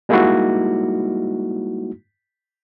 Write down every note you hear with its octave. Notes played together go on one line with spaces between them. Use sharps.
G3 G#3 A#3 D#4 E4 F#4